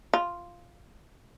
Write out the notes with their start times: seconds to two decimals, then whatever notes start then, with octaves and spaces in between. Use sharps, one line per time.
0.13 F4